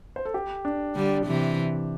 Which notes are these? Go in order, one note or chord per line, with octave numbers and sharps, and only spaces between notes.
C5
A4
G4
D4
D3 G3
C3 E3